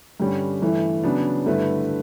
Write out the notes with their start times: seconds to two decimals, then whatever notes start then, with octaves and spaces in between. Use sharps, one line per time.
0.20 G2 D3 G3 C#4
0.62 G2 E3 A3 E4
1.03 C#3 F#3 B3 D4
1.46 G2 D3 A3 E4 B4